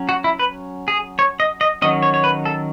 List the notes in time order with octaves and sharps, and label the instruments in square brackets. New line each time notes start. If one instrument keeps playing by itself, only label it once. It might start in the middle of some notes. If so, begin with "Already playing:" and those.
Already playing: [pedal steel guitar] F#3 C#4
F#4
E4
B4
G#4
C#5
D#5
D#5
D#3 F#3 C#4 D#5
C#5
C#5
B4
A4